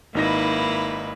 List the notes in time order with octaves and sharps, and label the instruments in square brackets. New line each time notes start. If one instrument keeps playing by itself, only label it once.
[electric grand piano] G#1 D#4 A#6 [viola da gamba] A#3 E4 B4